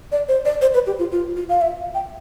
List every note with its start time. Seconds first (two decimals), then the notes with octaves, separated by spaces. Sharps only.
0.12 D5
0.28 C5
0.45 D5
0.62 C5
0.74 B4
0.87 G4
0.99 F4
1.12 F4
1.36 F4
1.49 F5
1.61 E5
1.95 G5